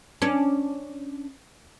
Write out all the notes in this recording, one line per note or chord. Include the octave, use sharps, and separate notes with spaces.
C#4 D4